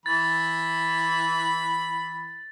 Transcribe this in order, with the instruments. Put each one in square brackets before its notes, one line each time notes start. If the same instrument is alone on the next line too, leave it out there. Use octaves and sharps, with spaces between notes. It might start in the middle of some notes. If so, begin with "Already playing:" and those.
[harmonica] E3 B5 [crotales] A6